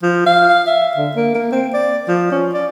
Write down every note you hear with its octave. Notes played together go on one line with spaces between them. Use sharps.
F3
F5
E5
D3
A#3
A#3
C4
D5
F3
C#4
D5